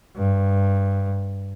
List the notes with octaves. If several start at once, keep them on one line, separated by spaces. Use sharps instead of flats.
G2